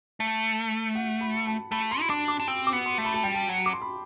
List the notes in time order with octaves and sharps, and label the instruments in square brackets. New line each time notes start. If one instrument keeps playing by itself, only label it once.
[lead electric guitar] A3
[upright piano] F#5
B5
A5
[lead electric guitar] A3 [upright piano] B5
[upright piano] C6
[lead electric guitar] E4
[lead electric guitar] D4 [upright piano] D6
[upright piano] D6
[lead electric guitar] D4
[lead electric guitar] C4 [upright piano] E6
[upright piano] D6
[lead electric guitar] B3
[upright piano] C6
[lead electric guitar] A3
[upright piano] B5
A5
[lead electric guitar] G3 [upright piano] G5
[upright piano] A5
[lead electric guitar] F#3
[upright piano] D6
C6
B5